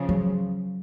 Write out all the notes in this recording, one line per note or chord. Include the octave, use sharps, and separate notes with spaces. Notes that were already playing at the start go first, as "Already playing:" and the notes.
Already playing: C#3 F3
F#3